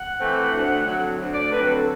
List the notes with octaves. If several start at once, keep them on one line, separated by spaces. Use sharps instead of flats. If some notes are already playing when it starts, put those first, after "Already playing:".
Already playing: F#5
E3 A3 C4
D2
D3 F#3 C4
D2
D5
D3 F#3 C4 B4
A4